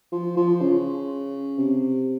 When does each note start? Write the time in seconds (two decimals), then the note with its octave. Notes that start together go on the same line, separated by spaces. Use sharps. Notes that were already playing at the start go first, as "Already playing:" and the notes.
0.12 F3
0.37 F3
0.61 C#3
1.58 C3